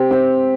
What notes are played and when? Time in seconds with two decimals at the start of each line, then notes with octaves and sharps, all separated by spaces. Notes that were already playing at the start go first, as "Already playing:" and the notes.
Already playing: C4 G4
0.11 C4